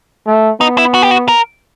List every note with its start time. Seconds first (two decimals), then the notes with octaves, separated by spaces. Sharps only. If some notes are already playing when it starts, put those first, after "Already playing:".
0.27 A3
0.61 B3 D#4
0.78 E4
0.94 F#4
1.03 G4
1.11 F#4
1.28 A#4